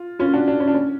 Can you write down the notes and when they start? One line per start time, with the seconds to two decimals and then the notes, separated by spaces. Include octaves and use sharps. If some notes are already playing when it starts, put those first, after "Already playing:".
Already playing: F4
0.19 C#4 F4
0.33 D4 F#4
0.48 D4
0.60 C#4
0.68 D4
0.74 C#4